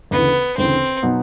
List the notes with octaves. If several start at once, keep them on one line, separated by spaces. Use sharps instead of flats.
D2 C#3 E3 B3
D2 C#3 E3 C4
B2 F#3 B3 D#4